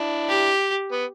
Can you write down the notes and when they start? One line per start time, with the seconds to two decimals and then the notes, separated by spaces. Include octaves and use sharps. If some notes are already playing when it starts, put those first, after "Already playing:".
Already playing: D4 E4
0.29 G4
0.92 B3